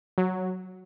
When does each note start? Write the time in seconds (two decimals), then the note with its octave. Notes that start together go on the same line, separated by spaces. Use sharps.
0.18 F#3